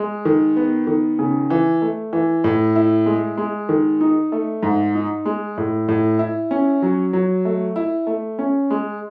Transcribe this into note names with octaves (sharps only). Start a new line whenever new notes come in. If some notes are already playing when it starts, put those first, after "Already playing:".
Already playing: G#3
D#3
B3
D#3
C#3
E3
A3
E3
A2
E4
G#3
G#3
D#3
D#4
A3
G#2
D#4
G#3
A2
A2
E4
C#4
F#3
F#3
A3
E4
A3
C#4
G#3